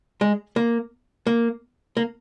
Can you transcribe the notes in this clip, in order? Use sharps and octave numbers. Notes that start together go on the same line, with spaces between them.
G#3
A#3
A#3
A#3